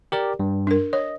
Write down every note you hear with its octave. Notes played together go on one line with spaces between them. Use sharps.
G4 A#4 D5
G2
D4 A#4
C#5 D#5